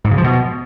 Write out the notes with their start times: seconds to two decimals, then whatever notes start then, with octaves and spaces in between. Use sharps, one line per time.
0.04 G#2
0.11 C#3
0.17 F3
0.24 B2